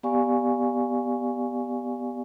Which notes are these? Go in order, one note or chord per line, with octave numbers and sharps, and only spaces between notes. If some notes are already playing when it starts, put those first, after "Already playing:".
B3 G4 D5 F5 G#5 C#6